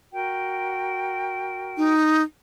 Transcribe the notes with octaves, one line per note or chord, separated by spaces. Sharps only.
F#4 A#4 G5
D#4